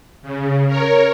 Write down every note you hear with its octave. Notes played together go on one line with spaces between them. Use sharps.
C#3
A#4 C#5